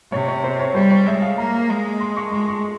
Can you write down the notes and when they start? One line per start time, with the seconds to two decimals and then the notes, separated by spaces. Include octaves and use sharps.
0.12 C3 C#5
0.28 C#5
0.44 C5
0.59 C#5
0.75 G3 C5
0.91 C#5
1.06 G#3 E5
1.22 F5
1.38 A#3 A#5
1.69 G#3
2.00 C6
2.16 C#6
2.32 G#3 C6
2.48 C#6